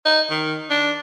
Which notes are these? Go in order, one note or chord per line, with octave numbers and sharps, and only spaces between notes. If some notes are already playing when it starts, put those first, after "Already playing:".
D#4
D#3
D4